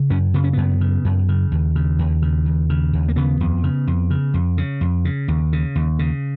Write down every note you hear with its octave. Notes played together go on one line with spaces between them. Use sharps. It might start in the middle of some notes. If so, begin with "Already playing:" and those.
Already playing: C#3
F#2 C#4
C#3 B3
C#4
F#2 B3
C#3
F#2
C#3
D#2
C#3
D#2
C#3
D#2
C#3
D#2
A#3
C#3 B3
F2
C#3
F2
C#3
F2
C#3
F2
C#3
D#2
C#3
D#2
C#3